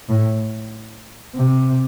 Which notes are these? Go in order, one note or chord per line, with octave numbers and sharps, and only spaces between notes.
A2
C3